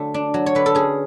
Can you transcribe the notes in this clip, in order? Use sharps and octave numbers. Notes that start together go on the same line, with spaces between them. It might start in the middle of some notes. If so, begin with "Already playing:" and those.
Already playing: D3 F#3 A3 G#4
D4
F#3
C#5
D3 B4
A4
C#4 G#4